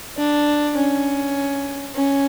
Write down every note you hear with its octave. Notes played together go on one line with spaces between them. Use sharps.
D4
C#4
C#4